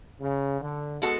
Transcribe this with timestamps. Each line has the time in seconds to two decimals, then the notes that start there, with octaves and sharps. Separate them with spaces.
0.20 C#3
0.61 D3
1.02 G#3 B3 F#4 A4